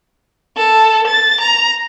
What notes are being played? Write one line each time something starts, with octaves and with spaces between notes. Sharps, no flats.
A4
A6
A#5